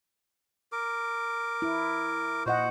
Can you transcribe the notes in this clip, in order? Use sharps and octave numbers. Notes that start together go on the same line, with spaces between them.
A#4 D6
E4
A#2 F#4 C5 D#5 F#5